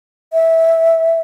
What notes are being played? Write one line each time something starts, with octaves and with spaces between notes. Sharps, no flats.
E5